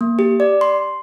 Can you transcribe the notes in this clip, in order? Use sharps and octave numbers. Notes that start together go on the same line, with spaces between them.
A#3
G4
D5
C6